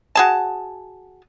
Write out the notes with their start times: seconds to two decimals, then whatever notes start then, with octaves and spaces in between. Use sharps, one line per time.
0.15 F#4 G#4 A5